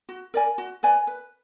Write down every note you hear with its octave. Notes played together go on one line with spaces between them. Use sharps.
F#4
A#4 D5 G#5
F#4
B4 D5 G#5
B4